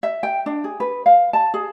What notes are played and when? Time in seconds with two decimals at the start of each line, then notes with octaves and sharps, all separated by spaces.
0.03 E5
0.23 G5
0.46 D4
0.64 G#4
0.80 B4
1.06 F5
1.33 A5
1.54 G#4